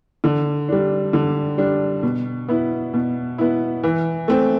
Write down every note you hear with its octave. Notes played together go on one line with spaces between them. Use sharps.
D3
G3 D4
D3
G3 D4
B2
B3 E4
B2
B3 E4
E3
A3 C4